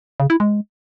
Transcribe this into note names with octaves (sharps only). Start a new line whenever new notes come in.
C#3
E4
G#3